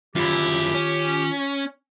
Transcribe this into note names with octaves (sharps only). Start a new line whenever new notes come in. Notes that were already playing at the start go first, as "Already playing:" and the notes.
F#2 D#3 E4 F4 G4
C#4